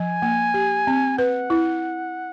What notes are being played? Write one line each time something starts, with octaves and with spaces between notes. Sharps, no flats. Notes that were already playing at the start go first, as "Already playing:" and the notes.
Already playing: F3 G#5
A#3
G4
C4
B4 F#5
E4